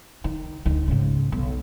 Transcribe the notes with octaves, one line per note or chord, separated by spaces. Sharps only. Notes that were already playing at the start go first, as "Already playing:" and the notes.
D#3
D2 D#3
G#2 C#3
B1